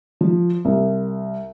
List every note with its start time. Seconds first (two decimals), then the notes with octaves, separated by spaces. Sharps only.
0.21 F3
0.65 C2